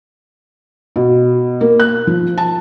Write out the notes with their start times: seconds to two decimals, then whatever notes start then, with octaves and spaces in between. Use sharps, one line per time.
0.96 B2
1.61 A#3
1.80 F#6
2.07 F3
2.38 A5